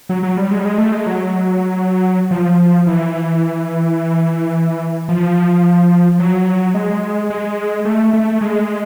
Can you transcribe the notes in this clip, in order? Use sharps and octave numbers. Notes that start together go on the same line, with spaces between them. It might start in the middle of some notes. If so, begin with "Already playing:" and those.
F#3
F#3
G3
G#3
G3
G#3
A3
G#3
F#3
F3
E3
F3
F#3
G#3
G#3
A3
A3
G#3